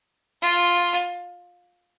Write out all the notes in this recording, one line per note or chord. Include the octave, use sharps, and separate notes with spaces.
F4